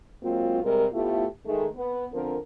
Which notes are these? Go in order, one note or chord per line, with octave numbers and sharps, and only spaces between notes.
F#3 G#3 A#3 C4 F4
C3 G3 G#3 A#4
A2 A3 B3 E4 F4 G4
D#3 G#3 A3
B3
D3 F3 C4 A#4